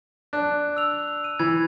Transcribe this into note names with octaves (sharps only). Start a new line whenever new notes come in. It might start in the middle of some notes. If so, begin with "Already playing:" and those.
D4 F#6
E6 F7
D#7
E3 G#6